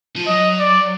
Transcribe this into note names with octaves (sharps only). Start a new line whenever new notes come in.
F3
F#3 D#5
D5